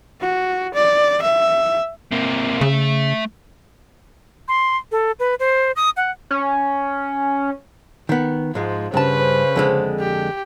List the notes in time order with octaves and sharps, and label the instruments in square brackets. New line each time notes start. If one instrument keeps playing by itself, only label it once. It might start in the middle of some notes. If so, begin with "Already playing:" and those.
[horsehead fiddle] F#4
D5
E5
[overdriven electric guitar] C3 A#3
[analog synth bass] C#3 [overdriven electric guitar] A3 E5
[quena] C6
A4
B4
C5
D#6
F#5
[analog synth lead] C#4
[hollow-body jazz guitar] D#3 B3
[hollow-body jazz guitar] G#2 G#3 [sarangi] F3
[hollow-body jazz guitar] G2 A5 [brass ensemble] C#3 C5 [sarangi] B4
[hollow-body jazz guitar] F2 D3 G#3
[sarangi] G4